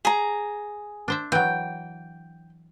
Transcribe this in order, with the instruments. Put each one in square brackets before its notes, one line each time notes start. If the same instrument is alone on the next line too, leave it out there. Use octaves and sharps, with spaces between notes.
[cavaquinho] G#4 A#5
[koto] D4 C5 E5
[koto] E3 F#3 [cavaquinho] G5